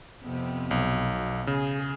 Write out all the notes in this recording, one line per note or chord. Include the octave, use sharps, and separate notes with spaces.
F2 C3 B3
B1
B2
C#3 G#4